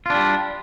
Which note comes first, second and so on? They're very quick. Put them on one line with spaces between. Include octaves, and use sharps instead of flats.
F4 D4 G3